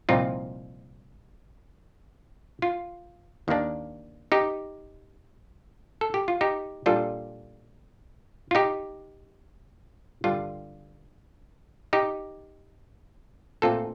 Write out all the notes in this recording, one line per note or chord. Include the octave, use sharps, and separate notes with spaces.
C2 A#2 F3 C4 D#4 F4
F4
D#2 D#3 A#3 D4
D#4 G4
A4
G4
F4
D#4 G4
A#2 G3 D4 F4 A4
F4
D#4 G4
G2 D3 G3 D4 F4
D#4 G4
A#2 A3 C4 F4 A4